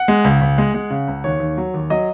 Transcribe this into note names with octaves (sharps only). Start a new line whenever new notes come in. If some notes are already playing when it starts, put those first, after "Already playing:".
Already playing: F#5
G#3
C#2
C#2
G#3
G#3
C#3
C#2
D#2 C#5
D#2
F#3
D#2
F#3 D#5